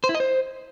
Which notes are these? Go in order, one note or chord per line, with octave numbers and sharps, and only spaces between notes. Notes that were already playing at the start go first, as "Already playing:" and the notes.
C5
E4
D#5
C5